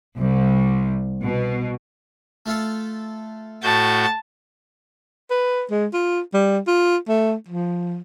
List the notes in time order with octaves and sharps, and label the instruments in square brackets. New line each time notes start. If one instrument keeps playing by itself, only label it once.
[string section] C2
B2
[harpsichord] A3 F4 A4
[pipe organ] A2 F#4 G6 [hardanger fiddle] A5
[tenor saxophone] B4
G#3
F4
G3
F4
A3
F3